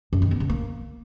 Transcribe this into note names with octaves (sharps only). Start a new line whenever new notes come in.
F#2
D#3
B3
C#3
A#3